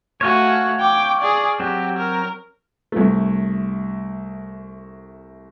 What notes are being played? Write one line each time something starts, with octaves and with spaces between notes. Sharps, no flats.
A3 F#4 C#5 F5 G#5
G5 D6
G#4 D5
F#3 C4 G4
A#4
C2 A3